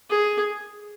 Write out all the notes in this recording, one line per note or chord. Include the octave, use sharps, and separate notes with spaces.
G#4